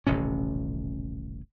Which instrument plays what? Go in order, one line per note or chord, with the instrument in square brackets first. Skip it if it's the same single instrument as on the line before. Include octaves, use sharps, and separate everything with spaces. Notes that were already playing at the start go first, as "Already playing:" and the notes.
[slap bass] D#1 A1 C3 C#4